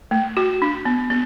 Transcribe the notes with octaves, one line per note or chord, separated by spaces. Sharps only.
A3
F#4
D4
B3
B3